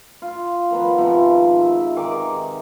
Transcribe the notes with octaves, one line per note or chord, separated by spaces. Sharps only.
F4
D#3 F3 B3
G#2 C3 D#3 F3
E5
D#3 G#4 D6